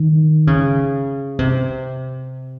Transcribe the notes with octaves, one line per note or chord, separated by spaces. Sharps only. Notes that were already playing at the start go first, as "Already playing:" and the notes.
Already playing: D#3
C#3
C3